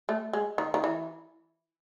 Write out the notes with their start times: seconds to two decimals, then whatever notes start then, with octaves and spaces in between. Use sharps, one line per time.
0.09 A3
0.33 G#3
0.58 D#3
0.74 D#3
0.84 E3